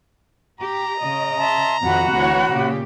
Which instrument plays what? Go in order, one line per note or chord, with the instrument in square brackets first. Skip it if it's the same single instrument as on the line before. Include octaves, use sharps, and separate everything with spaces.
[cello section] G4 [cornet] A#5
[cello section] C#3 D#5
[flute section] E5 A5 C6
[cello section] F2 C3 D#3 [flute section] F#4 F#5 B5
[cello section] D2 E3 C#5
A#2 C#3 G4